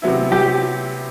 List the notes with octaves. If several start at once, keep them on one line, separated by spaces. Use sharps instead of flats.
C3 F#3 B3 E4
G4